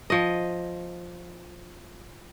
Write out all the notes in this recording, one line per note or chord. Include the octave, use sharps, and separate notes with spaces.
F3 D#5